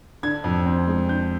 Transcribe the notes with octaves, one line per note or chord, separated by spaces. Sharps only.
D3 G#6
F2
C4
G#3
D3 G6